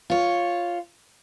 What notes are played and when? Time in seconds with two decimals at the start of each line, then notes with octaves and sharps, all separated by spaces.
0.10 F4 C#5